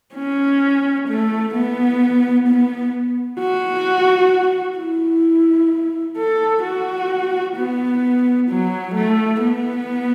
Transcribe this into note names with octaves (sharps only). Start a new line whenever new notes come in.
C#4
A3
B3
B3
F#4
E4
A4
F#4
B3
F#3
A3
B3